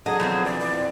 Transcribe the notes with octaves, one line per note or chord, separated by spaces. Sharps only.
D3 F#3 G#4 D#5 A5
B2 F3 C4
E3 D5
D5
F2